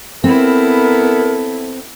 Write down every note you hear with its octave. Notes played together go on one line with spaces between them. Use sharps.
B3 C4 E4 A4 A#4